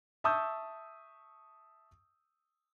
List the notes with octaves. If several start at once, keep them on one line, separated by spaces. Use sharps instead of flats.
E5 A5 C#6 D#6 E6 G6